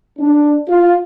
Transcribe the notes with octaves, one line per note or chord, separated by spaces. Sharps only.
D4
F4